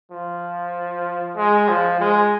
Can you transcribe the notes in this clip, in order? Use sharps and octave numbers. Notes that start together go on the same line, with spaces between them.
F3
G#3
F3
G#3